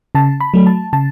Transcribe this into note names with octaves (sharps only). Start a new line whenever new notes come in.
C#3 A5
B5
F#3 A3
A5
C#3 A5